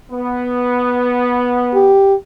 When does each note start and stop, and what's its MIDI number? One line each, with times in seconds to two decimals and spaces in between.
0.11 1.96 59
1.75 2.15 67